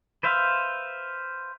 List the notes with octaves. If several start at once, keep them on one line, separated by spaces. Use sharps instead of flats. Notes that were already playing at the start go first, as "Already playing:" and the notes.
B4 C5 E5 F5